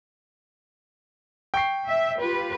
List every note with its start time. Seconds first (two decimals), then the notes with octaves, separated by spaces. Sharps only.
1.54 G5 C#6 C7
1.87 E5
2.20 F4 G4 B4